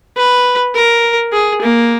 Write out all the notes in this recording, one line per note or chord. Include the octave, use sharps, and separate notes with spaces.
B4
A#4
G#4
A#3